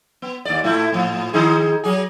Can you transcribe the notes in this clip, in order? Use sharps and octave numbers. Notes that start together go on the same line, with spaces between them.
B3
D#2 D5
A2 A3 E4
A2 F3
D#3 D#4 G#4
F#3 G#4